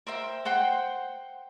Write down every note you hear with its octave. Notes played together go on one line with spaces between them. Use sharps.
A#4 C5 E5 G5
C5 F#5 G5 C6